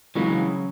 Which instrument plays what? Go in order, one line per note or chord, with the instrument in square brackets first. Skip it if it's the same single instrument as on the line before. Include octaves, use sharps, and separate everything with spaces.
[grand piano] C#3 F#3 C#4 F#4 [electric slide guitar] E3 G#3